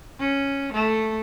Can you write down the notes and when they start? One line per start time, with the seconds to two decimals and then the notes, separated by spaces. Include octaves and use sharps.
0.19 C#4
0.73 A3